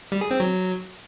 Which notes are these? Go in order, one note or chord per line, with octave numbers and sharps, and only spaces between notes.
G3
G#4
C4
F#3